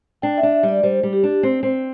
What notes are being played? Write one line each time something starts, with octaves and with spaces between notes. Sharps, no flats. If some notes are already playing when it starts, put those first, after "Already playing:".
D4 G5
E5
D4
E5
G3
D5
G3 C5
G3
G4
D4
C4
C4